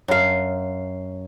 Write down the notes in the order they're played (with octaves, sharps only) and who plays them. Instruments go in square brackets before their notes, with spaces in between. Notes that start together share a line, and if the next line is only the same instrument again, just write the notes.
[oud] F#2 F5